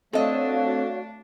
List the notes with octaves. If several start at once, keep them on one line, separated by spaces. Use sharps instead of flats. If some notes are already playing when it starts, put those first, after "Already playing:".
A3 C4 D4 F#4 A4 C#5 D#5 F5